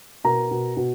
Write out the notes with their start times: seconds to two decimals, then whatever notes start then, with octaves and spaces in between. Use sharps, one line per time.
0.24 B2 A#4 A#5
0.51 B2
0.77 B2